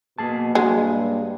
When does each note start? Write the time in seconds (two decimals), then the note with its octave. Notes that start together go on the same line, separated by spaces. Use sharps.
0.18 B2 A#3 G#4 A5
0.55 G2 F#3 G#3